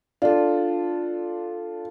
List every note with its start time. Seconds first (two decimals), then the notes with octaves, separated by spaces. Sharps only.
0.22 D4 F4 A4